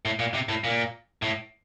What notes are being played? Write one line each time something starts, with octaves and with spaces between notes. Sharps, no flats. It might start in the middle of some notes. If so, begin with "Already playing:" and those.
A2
A#2
C3
A2
A#2
A2